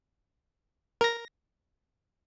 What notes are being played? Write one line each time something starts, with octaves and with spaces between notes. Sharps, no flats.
A#4 A#6